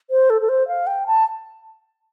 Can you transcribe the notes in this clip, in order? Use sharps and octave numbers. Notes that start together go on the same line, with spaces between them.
C5
A4
A4
C5
F5
G5
A5